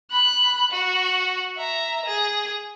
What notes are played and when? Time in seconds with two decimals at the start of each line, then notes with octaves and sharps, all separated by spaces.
0.11 B5 F#6
0.71 F#4
1.57 E5 A#5
2.06 G#4